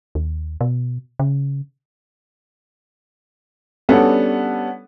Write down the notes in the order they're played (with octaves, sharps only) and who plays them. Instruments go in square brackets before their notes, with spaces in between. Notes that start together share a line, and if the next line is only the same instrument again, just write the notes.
[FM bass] D#2
B2
C#3
[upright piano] G3 B3 C#4 D4 F#4 A4